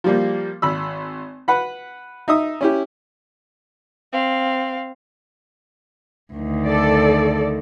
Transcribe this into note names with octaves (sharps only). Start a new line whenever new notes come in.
F3 G3 A#3
G#1 B5 E6
B4 F#5 B5
D#4 E5 D#6
C#4 E4 G4
C4 F5
D2 D#3
A4 D5